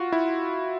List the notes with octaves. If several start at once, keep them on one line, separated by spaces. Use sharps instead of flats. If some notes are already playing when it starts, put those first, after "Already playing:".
Already playing: F4 F#4
E4